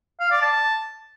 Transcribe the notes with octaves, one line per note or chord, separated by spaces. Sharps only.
F5
D5
A5